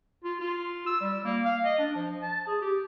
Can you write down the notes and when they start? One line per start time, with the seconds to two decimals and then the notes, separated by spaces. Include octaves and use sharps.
0.24 F4
0.41 F4
0.86 E6
1.01 G3
1.25 A#3
1.45 F5
1.64 D#5
1.79 D4
1.96 F3
2.22 A5
2.47 G#4
2.61 G4